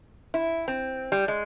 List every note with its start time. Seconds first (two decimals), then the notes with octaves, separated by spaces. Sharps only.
0.34 E4
0.68 C4
1.12 G3
1.28 G#3